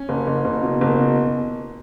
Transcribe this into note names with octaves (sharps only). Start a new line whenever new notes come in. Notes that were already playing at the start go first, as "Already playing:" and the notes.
Already playing: C#4
F#1
F#1
F#1
B2
F#1
B2